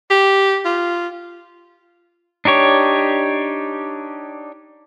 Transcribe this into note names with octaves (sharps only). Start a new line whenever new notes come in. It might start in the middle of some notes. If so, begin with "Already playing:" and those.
G4
F4
D4 D#4 G4 C#5